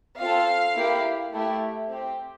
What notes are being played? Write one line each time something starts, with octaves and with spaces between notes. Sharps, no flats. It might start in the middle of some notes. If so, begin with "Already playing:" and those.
C4 F4 A4 F5
A#3 E4 G4
A3 E4 G4
C4 G4